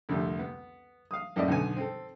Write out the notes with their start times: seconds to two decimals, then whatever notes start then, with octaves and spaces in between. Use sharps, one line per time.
0.09 C2 F2 D3 G3 A3
0.39 B3
1.11 F5 D#6
1.36 F#2 A2 A3 D5 D#5
1.48 B1 D3 B3 G#5
1.77 C4 A4